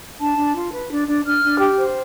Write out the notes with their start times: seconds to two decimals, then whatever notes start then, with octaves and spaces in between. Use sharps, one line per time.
0.20 D4 A5
0.37 D4
0.55 F4
0.73 B4
0.91 D4
1.08 D4
1.25 D4 F6
1.43 D4
1.60 G4
1.78 C5